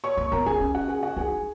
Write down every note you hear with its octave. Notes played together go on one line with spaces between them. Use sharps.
C#5 C#6
A#3 C#5 C#6
B3 A#4 A#5
C#4 G#4 G#5
C#4
F#4 F#5
G#4 G#5
F#4 F#5
D#4 G#4 G#5